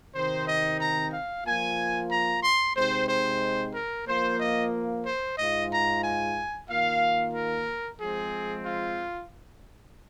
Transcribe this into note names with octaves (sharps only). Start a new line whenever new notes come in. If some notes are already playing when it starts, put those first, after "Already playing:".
C3 D#3 C4 D#4 C5
D#5
A#5
F5
F3 A#3 F4 G#5
A#5
C6
C3 G#3 C4 D#4 C5
C5
A#4
F3 A#3 F4 C5
D#5
C5
G#2 G#3 F4 D#5
A#5
G#5
D#3 A#3 F4 F5
A#4
F3 G#3 C4 G#4
F4